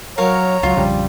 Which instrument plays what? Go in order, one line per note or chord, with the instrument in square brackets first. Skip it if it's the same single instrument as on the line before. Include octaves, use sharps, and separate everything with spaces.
[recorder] F#3 [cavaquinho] A#4 F5 [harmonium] C#5 A#5
[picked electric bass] C#2 [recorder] F#3 [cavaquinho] F4
[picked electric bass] A#1 F2 C#3 [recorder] G3